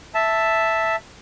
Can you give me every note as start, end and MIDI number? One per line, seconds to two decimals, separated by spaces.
0.15 0.96 76
0.15 0.96 81